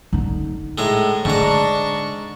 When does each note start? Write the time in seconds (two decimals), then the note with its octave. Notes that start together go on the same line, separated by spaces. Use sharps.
0.13 D3 D#4
0.78 A2 G#3 A#5
1.25 G#2 D3 D4 A#5 C#6